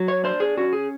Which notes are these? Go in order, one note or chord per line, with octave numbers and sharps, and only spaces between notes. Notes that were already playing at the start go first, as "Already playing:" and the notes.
Already playing: F#3
C#5
D4 C5
G#4
C#4 F#4
G#4